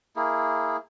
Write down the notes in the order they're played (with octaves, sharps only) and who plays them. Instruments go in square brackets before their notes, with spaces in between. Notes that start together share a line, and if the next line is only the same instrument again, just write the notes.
[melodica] A#3 E4 G#4